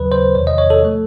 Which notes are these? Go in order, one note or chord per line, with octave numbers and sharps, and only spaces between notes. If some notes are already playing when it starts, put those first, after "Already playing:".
Already playing: D#2 C#3 F#3 B4
C5
E2 C3 D#3 C#5
D#5
C#5
A4
F3 A3